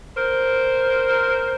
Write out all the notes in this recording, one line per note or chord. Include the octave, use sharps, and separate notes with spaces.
A#4 C5